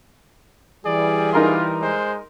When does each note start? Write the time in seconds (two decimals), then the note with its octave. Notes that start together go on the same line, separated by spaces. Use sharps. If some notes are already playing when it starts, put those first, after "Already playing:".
0.86 E3 G3 G#4 D5
1.33 D#4 F4 A#4 C6
1.82 G#3 C5